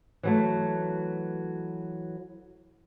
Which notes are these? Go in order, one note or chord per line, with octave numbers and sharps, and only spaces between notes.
E3 F#3 A3